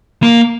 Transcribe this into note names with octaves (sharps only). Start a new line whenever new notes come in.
A#3